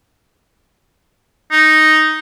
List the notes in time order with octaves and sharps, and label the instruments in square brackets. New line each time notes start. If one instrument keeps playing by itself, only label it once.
[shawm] D#4